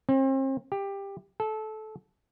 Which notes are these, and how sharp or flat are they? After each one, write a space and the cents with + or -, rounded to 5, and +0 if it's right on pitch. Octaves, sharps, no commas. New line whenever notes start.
C4 +40
G4 +15
A4 -20